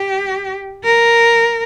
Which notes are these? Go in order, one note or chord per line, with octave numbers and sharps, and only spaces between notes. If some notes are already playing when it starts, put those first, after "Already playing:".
Already playing: G4
A#4